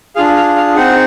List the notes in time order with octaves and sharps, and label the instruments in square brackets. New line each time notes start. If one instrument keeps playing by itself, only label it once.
[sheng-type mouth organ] D4 F4 G#4 F5
F5
F5
C4 D#4 G#4 F#5